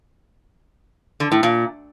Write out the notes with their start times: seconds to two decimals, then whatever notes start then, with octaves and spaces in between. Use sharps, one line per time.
1.20 D3
1.32 A2
1.43 A#2